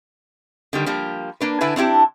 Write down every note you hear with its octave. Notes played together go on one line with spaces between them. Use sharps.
D3 D#3 G3
F3 G3 A#3
A#3 D4 B4
D3 D4 E4 B4 G#5
C4 D4 E4 G4